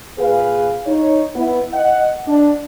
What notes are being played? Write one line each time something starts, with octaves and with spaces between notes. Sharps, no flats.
A#2 G#4 B4 F5
D#4 C#5
B3 E4
D#5 F#5
D4